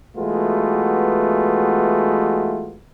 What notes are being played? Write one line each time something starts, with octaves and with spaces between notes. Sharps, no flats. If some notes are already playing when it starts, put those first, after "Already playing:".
E3 G#3 A3 B3 F4 F#4